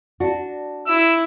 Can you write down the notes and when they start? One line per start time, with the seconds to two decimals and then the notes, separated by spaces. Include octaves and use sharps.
0.20 D4 F#4
0.87 E4 E6